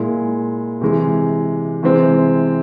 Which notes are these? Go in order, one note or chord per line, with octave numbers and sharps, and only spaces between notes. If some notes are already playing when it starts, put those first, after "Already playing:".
Already playing: A#2 G#3 E4
C3 E3 G#3
C3 E3 G#3 C4